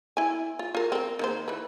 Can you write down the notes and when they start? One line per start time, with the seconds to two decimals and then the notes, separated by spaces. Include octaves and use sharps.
0.17 E4 G#5
0.59 F4
0.75 F4 A#4
0.92 C4 A#4
1.19 D#3 A#3 C5
1.48 E3 B4